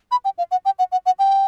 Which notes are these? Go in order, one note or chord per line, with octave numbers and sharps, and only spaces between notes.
B5
G5
F5
F#5
G5
F#5
F#5
F#5
G5